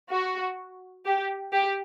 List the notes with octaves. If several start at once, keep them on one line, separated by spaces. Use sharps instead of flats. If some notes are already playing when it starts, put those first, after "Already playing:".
F#4
G4
G4